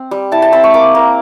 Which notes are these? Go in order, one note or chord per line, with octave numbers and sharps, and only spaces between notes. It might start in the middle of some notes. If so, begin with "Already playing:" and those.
Already playing: C4
G3
E4 A5
A5
C4 B5
C#6
A#3 D6
A#3